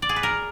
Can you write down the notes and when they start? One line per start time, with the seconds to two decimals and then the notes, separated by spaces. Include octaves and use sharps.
0.02 D5
0.09 G#4
0.16 B4
0.23 A#4